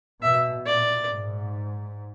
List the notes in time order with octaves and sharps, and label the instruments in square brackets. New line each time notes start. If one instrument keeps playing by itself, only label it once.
[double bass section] B2 [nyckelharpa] E5
[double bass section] A#2 [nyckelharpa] D5
[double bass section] G#2